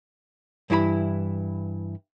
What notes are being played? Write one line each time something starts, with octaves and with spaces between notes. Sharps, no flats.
G2 E3 E4 F#4 B5